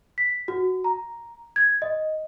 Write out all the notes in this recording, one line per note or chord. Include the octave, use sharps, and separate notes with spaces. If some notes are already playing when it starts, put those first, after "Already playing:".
B6
F#4
A#5
G#6
D#5